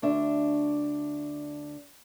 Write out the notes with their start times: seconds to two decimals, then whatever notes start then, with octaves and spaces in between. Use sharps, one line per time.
0.02 D2 D4 E5